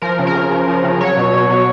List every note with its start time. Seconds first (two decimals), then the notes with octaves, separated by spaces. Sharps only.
0.02 F3 A#4
0.19 C#3
0.27 A#4
0.35 C#3
0.51 F3
0.68 F3
0.84 C#3
1.01 F#3 C#5
1.17 B2
1.33 B2
1.49 F#3